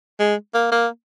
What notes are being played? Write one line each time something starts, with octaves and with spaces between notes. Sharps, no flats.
G#3
A#3
A#3